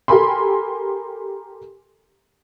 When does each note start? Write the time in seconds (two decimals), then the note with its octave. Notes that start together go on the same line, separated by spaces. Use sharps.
0.08 G4 A4 A#4 G#5 B5 C6